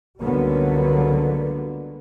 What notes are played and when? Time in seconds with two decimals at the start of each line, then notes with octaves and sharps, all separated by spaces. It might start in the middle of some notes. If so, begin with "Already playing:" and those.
0.21 C#2 D3 F#3 G3 A#3 B3